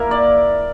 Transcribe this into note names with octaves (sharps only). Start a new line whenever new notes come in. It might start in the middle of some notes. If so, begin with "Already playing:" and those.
Already playing: A#3 E4 A#4
D5